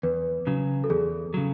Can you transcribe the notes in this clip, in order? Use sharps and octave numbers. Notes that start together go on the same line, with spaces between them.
E2 B4
C#3 F#3
A4
E2 G#4
C#3 F#3